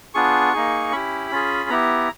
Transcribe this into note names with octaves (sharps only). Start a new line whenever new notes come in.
B3 D4 F4 G#4 C#6
A#3 D#4 G#4
C#4 E4 G4 B5
C#4 F4 G#4
B3 E4 G4 A#5